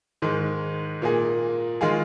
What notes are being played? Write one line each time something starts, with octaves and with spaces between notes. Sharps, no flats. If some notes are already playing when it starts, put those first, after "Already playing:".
G#2 D#3 G#3
A#2 A#3 G#4
D#3 G#3 F4 G#4